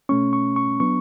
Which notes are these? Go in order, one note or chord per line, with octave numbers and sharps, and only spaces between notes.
B2 A3 C#4 C#6
C#6
C#6
F#3 B3 D4 C#6